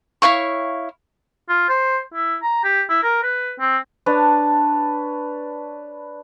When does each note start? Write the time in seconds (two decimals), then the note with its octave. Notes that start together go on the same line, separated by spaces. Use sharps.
0.22 E4 C#5 F5 C#6
1.49 F4
1.69 C5
2.14 E4
2.42 A#5
2.64 G4
2.89 E4
3.03 A#4
3.23 B4
3.60 C4
4.06 D4 B4 C#5 A5